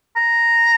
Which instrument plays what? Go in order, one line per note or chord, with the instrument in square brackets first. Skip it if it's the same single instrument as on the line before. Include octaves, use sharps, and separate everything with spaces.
[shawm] A#5